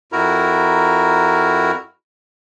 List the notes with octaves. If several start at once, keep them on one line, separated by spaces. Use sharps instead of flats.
F2 E4 F#4 A#4 A#5